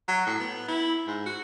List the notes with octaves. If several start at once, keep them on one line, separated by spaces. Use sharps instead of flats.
F#3
A2
B3
E4
G#2
F#4